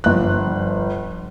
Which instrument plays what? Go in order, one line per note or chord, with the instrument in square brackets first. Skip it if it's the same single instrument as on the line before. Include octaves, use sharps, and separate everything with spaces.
[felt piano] G1 F#6 [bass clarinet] F3